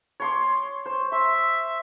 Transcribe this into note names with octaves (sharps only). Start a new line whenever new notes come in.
C#5 C6 D6
C5
E5 C6